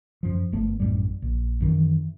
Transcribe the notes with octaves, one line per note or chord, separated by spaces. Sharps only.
F#2 F3
G1 A3 B3
A1 F#2 A2 G3
A#1
F#2 D#3 E3